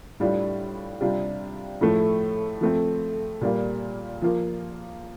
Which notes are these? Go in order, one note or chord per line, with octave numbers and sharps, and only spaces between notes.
A2 G3 D4 F4
C3 G3 D4 F4
A2 F3 A3
F3 A3 C4
A#2 G3 A#3 F4
F3 A#3 F4